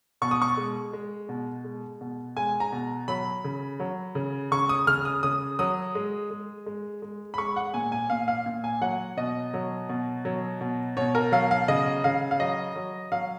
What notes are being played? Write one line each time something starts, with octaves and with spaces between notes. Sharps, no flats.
B2 C#6
D#6
C#6
G#3
G#3
B2
G#3
B2
G#3 G#5
A#5
B2
F#3 B5
C#3
F#3
C#3
C#3 C#6
D#6
C#3 F6
D#6
C#3 D#6
F#3 D#6
G#3
G#3
G#3
G#3
B5
G#3 C#6
F#5
A#2 G#5
G#5
A#2 F5
F5
A#2
G#5
F#3 F#5
B2 D#5
F#3
B2
F#3
B2
B2 C#5
A#4
F#3 F5
F5
C#3 D#5
C#3 F5
F5
F#3 D#5
F#3
F#3 F5